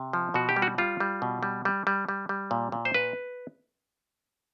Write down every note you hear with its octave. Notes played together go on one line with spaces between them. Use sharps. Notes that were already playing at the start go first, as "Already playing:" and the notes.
Already playing: C3
F3
B2 F#4
G4
G3
F#4
G3 F4
G3
B2
G3
G3
G3
G3
G3
A#2
A#2
C5
A#2 B4